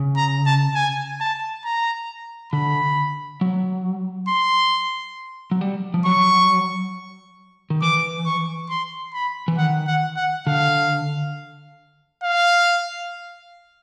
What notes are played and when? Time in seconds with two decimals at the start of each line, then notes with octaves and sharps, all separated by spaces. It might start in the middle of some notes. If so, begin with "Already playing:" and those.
Already playing: C#3
0.17 A#5
0.46 A5
0.75 G#5
1.20 A5
1.65 A#5
2.53 D3 B5
3.41 F#3
4.28 C6
5.51 F#3
5.61 G3
5.94 F3
6.06 F#3 C#6
7.70 D#3
7.82 E3 D6
8.26 C#6
8.70 C6
9.14 B5
9.48 E3
9.58 D#3 F#5
9.87 F#5
10.17 F#5
10.47 D3 F5
12.23 F5